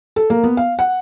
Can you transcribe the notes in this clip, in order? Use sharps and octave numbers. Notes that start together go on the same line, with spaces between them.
A4
A#3
B3
F5
F#5